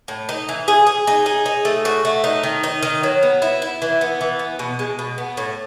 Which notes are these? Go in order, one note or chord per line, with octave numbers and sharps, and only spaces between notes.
A2
D#4
E3
G#4
G#4
D#4
G#4
D#4
A3
F#4
A3
D#4
D#3
D#4
D#3
F#3
B3
E4
E4
E3
B3
E3
B3
B2
G#3
B2
B3
A2